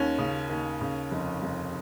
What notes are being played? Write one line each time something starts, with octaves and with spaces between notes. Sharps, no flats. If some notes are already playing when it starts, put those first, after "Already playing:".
Already playing: D#2 C#4
C#3
D#2
C#3
F1
F1